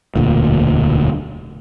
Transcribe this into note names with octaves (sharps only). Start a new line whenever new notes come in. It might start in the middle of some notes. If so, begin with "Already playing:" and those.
E1 D2 A#2